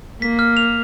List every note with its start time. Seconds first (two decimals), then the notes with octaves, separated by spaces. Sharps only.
0.21 A#3 B6
0.39 F6
0.57 F7